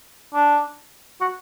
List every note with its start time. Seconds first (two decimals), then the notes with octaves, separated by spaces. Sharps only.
0.34 D4
1.21 F#4